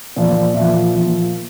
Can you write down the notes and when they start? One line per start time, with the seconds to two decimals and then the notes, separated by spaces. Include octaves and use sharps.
0.16 A#2 F3 D5
0.54 A#2 F3 E5
0.94 A#2 F3